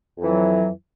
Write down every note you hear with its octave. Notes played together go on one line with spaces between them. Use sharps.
F2 E3 F#3